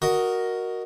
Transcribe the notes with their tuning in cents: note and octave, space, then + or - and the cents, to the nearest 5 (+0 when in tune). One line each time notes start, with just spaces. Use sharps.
F#4 +0 A#4 +0 D#5 +0